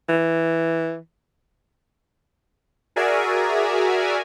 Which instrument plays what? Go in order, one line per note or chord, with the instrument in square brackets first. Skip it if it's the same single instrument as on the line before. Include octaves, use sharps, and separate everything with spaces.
[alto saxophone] E3
[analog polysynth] F#4 G#4 A#4 D5 E5 G#5